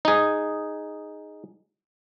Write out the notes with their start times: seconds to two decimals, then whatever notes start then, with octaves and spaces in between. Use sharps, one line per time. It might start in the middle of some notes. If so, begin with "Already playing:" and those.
0.05 D#4 G#4